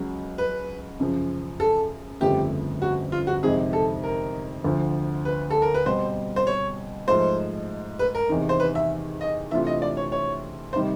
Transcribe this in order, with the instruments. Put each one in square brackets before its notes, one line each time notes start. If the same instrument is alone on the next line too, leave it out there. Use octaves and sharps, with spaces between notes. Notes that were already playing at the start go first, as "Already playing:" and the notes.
Already playing: [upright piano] C#2 C#3 F#3
[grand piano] B4
[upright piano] F#2 C#3 F3
[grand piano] A4
[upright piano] G1 F2 C#3 F3 A3 [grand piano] G4
[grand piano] F#4
F4
F#4
[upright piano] F2 C3 D#3 G#3 [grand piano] G#4
[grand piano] A4
A#4
[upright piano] D2 D3 F3
[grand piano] B4
A4
A#4
B4
[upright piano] B2 G3 C4 [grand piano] C5
[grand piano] C5
C#5
[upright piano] G#2 F3 A3 [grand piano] C5
[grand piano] B4
A#4
[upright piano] E2 C3 D#3
[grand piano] C5
B4
E5
D#5
[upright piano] C3 E3 A3 D4 F4 [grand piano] E5
[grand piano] D#5
D5
C#5
C#5
[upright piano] C3 D#3 G3 [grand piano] C5